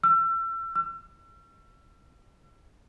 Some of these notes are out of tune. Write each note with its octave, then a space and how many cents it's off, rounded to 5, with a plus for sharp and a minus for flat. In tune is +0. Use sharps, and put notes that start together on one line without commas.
E6 +35
E6 +40